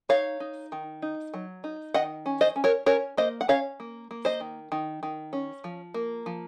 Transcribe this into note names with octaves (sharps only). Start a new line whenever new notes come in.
D#4 C#5 F5
D#4
D#3
D#4
F#3
D#4
D#3 D#5 F#5
C#4
C5 D#5
C#4
A#4 C#5
C#4 A#4 C#5
A#3 C5 D#5
F#5
C#4 C#5 F5
A#3
A#3
C5 D#5
D#3
D#3
D#3
C#4
F3
A#3
F3